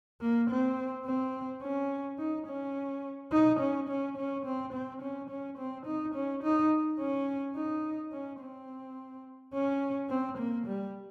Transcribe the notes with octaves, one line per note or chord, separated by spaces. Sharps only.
A#3
C4
C4
C#4
D#4
C#4
D#4
C#4
C#4
C#4
C4
C4
C#4
C#4
C4
D#4
C#4
D#4
C#4
D#4
C#4
C4
C#4
C4
A#3
G3